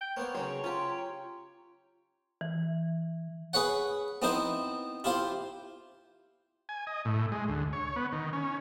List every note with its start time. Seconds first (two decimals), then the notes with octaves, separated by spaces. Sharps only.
0.01 G5
0.17 A#3 B3 C5 C#5
0.35 C#3 F#3 G#4 C5 G5 A#5
0.64 C#4 F4 G4 G5 A#5 C6
2.41 E3
3.53 G#4 B4 C#5 F#5
4.22 B3 C4 D#4 E4 C5
5.04 E4 F4 G4 C5
6.69 G#5
6.87 D#5
7.05 A2
7.32 G#3
7.48 D2
7.73 C#5
7.96 B3
8.12 D#3
8.33 C#4